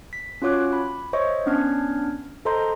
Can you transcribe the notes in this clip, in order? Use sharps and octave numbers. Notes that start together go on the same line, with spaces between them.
B6
C#4 F4 F#4 C#5 D6 F#6
B5
C5 C#5 D#5 E5 C#6
B3 C#4 D4 F6 G#6
A4 C5 D#5 A#5 C6 G6